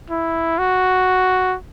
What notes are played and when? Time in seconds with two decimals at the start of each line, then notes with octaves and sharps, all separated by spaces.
0.10 E4
0.58 F#4